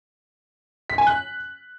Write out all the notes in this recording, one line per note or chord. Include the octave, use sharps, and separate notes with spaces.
B6
G#5
F#6